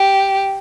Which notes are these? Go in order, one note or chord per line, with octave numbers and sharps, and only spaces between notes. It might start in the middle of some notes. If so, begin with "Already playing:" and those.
Already playing: G4